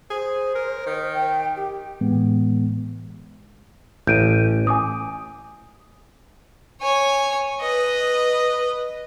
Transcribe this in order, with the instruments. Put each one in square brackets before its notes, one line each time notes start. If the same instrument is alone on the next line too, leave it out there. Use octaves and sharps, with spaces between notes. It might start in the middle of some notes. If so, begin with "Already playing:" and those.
[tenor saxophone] G#4 [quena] C5
[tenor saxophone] A#4
D#3
[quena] G5
G4
[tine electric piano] A2 E3 G#3 B3
[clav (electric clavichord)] A1 [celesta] G6 D7 D#7
[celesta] G#5 D6 D#6
[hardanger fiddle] C#5 G#5
B4 D#5